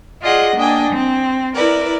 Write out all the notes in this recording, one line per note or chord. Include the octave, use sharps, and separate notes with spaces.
F4 G#4 D5 D#5 F#5
A#3 D4 D#5 G5 G#5
C4
E4 A#4 B4 D5